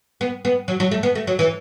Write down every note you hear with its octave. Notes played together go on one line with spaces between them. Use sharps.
B3
B3
F#3
F#3
A3
B3
A3
F#3
E3